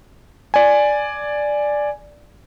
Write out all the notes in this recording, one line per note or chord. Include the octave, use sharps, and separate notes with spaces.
D5 G#5